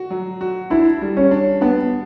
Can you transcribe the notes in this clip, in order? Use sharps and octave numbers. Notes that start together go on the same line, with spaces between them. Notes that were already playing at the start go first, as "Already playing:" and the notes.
Already playing: F#4
F#3
F#4
D4 E4
G3
C#4
D4
B3 D4